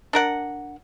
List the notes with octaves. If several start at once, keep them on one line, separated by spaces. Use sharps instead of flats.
D4 A#4 F#5